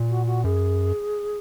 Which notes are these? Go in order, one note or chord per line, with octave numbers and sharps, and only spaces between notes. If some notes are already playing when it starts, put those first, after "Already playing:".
Already playing: A#2
F#4
F#4
F#2 G#4